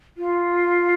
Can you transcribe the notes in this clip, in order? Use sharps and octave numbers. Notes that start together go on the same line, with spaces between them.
F4